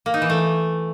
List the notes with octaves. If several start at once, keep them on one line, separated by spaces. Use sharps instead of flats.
A#3
D#4
E3
A3